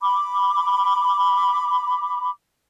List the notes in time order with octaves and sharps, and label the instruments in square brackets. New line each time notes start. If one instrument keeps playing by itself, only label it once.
[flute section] B5 D6